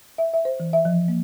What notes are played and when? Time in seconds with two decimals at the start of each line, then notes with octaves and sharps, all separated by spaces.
0.18 E5
0.33 E5
0.45 C5
0.60 E3
0.73 E5
0.85 F3
1.08 A#3